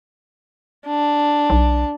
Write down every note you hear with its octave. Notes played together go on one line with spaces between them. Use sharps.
D4
B1